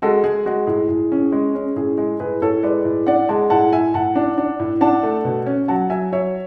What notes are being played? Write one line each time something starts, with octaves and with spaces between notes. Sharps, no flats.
G#3 F#4 A4
G#3 G#4
G#3 F#4
A2 G#4
A2
C#4
G#3
C#4
A2 G#4
G#3
A2 G#4 B4
A2 A4 C#5
G#3 B4 D5
A2
D4 D5 F#5
G#3 F#5 A5
A2 F#5 A5
A2 E5 G#5
A2 F#5 A5
D4
D4
A2
D4 F#5 A5
A3
B2
C#4
F#3 F#5 A5
F#3 E5 G#5
F#3 C#5 E5